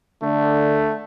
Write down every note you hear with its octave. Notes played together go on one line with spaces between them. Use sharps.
D3 A3